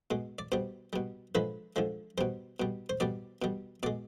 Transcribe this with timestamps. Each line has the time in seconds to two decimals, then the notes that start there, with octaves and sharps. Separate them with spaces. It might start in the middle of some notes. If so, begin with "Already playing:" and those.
0.11 B2 G#3
0.39 D5
0.52 B2 G3 C5
0.93 B2 G3
1.35 D3 F3 G#3 B4
1.76 D3 F3 G#3
2.18 B2 G3 C5
2.60 B2 G3
2.89 C5
3.00 B2 G3 D5
3.42 B2 G3
3.83 B2 G#3 D5